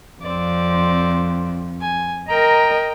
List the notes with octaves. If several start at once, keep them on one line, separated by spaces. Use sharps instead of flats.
F2 C4 D5
G#5
A#4 D#5 G5 A#5